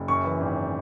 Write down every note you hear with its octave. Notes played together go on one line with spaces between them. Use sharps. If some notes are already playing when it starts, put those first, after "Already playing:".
Already playing: F#1
F#2 C#6
E3
G#1